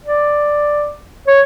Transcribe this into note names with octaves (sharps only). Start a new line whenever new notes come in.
D5
C#5